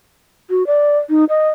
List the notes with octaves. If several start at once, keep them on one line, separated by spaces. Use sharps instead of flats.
F#4
D5
D#4
D#5